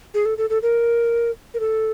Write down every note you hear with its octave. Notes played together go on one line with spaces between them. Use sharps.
G#4
A4
A4
A4
A#4
A#4
A4